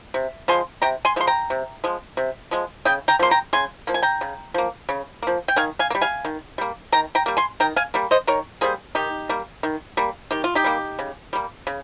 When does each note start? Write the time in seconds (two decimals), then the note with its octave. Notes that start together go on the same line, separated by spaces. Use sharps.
0.14 C3
0.48 F3 G#3 G#5 C6
0.82 C3 G5 A#5
1.05 G#5 C6
1.16 F3 G#3 C6
1.27 G5 A#5
1.50 C3
1.84 F3 G#3
2.17 C3
2.51 F3 G#3
2.85 C#3 D#5 G5
3.08 G5 A#5
3.19 F3 A#3 C6
3.31 G5 A#5
3.53 C#3 G#5 C6
3.87 F3 A#3
3.94 G#5
4.02 G5 A#5
4.21 C#3
4.54 F3 A#3
4.89 C#3
5.22 F3 A#3
5.48 G5
5.56 D#3 F5 G#5
5.79 F5 G#5
5.90 A#3
5.95 G3
6.01 F5 G#5
6.25 D#3
6.58 G3 A#3
6.92 D#3 G5 A#5
7.15 G5 A#5
7.26 G3 A#3
7.37 G#5 C6
7.60 D#3 G5 A#5
7.76 F5 G#5
7.94 G3 A#3
8.11 C5 D#5
8.27 D#3 A#4 C#5
8.61 G3 A#3 G#4 C5
8.95 D#3 D#4 G4
9.29 G3 A#3
9.63 D#3
9.97 G3 A#3
10.31 D#3 G4
10.44 F4
10.55 D#4 G4
10.64 G3 A#3
10.99 C#3
11.33 G3 A#3
11.67 C#3